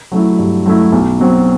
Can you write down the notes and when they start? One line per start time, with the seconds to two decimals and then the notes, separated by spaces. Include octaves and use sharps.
0.12 F#3 A3 E4
0.38 G2
0.66 F#3 A3 E4
0.92 B1
1.20 B2 F#3 C4